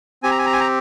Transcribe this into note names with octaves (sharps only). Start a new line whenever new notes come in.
C4 G4 G#5
A#5
G#5
A#5
G#5
A#5